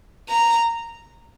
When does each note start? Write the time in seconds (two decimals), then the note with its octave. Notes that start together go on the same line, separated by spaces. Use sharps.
0.29 A#5